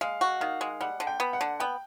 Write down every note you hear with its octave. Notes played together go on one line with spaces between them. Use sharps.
G#3 F5
F#4
D#3 F5
G#3
G3 F#5
D3
G5
B3
F#5
D3
B3 G5